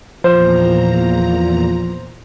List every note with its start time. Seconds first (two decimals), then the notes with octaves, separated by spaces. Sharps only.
0.24 E2 A#2 F3 F4 C5 A#5